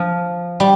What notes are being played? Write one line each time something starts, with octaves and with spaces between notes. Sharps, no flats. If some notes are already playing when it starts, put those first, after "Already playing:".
Already playing: F3
G3